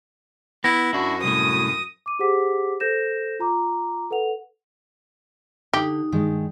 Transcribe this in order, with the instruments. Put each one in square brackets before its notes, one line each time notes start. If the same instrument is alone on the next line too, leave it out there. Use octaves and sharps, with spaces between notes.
[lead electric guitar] B3 [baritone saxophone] E4 [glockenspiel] A#6
[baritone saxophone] F#2 [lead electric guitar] D4 E4 [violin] F#4
[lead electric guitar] C2 A2 [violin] D#6
[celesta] D6 D#7
G4 G#4 C5 F#5 D6 B6
A4 C5 G6 A#6 E7
F4 A#5 D6
A4 B4 F#5 F7
[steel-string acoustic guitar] D3 [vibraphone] D#4 [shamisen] G4
[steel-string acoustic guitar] G2 D#3 G#3